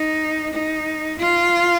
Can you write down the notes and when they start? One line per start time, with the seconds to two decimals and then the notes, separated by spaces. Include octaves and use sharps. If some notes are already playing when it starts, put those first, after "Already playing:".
Already playing: D#4
0.53 D#4
1.19 F4